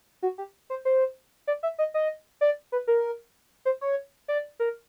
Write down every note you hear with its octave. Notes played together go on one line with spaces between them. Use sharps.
F#4
G4
C5
C5
D5
E5
D#5
D#5
D5
B4
A#4
C5
C#5
D5
A#4